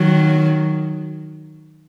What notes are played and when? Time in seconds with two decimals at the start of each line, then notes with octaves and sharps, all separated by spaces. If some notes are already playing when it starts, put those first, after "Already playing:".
Already playing: D#3 F#3